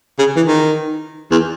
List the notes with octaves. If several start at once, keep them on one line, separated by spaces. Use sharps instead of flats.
C#3
E3
D#3
E2